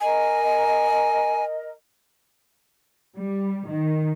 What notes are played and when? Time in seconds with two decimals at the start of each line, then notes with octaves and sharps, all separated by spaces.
0.01 A#4 D#5 G#5
3.19 G3
3.69 D#3